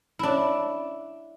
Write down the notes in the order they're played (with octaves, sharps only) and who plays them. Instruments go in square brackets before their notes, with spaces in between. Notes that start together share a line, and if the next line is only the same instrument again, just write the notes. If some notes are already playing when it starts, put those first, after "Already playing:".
[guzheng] D4 E4